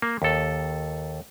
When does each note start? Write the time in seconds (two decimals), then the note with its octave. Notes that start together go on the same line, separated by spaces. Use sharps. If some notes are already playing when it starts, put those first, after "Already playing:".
0.02 A#3
0.22 D#2 A4